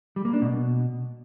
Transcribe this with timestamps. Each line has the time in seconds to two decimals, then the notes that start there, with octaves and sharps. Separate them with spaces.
0.16 G3
0.25 A#3
0.33 D4
0.42 B2